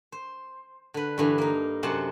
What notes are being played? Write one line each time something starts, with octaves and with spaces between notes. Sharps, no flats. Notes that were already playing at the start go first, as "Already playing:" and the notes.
C5
D3 B4
G2 D3 E3
A#3 D#4
F#2 C3 C5 F#5 A5